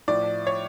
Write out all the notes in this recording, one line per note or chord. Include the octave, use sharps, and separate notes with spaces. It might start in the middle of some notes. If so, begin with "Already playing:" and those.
A2 F3 D5
C#5